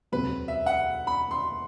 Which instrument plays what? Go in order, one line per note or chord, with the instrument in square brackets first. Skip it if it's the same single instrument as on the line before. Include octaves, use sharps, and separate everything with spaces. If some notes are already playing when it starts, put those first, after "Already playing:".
[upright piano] E1 D2 C3 F#3 C4 [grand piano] B4
[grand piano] E5
F#5
B5
C6